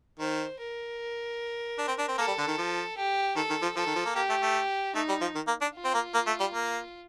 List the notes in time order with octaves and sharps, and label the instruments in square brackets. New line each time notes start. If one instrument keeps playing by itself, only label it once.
[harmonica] D#3 [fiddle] C5
[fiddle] A#4
[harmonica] D4
C4
D4
C4
[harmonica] A#3 [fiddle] A4
[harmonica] G3
D3
D#3
F3
[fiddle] G4
[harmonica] D#3 [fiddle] A4
[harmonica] D#3
F3
[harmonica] F3 [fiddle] A4
[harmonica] D#3
F3
A#3
[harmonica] A#3 [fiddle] G4
[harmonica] A3
A3
[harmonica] A3 [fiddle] D#4
[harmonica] G3
F3
D#3
A#3
D4
[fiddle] F4
[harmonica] C4
A#3
A#3
A3
G3
A#3